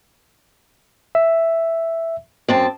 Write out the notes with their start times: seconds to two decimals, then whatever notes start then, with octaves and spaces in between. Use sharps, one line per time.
1.15 E5
2.48 F#2 C4 A5